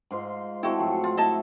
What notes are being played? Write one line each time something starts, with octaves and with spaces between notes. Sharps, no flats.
G#2 F4 C5
C4 E4 F#4 A4 A5
A2 F3 F#3
F4
E4 D#5 E5 F#5 A5